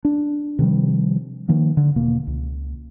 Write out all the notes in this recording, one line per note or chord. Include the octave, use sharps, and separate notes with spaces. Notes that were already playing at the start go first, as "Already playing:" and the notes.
D4
C3 D#3 F3 G3
D#3 F3 A#3
D3
E1 B2 A#3
C#2